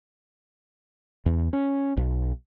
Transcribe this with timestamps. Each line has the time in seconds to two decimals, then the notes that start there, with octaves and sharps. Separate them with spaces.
1.26 E2
1.53 C#4
1.97 B1